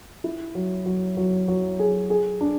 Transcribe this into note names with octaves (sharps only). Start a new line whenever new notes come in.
E4
F#3
F#3
F#3
F#3
G#4
G#4
D4